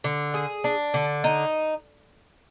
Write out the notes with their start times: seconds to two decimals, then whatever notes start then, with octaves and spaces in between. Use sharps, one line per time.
0.04 D3
0.34 G#4
0.64 D4
0.94 D3
1.24 D#4